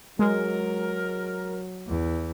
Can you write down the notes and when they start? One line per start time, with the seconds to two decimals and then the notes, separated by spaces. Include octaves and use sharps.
0.19 F#3 G#3 A#4
1.87 E2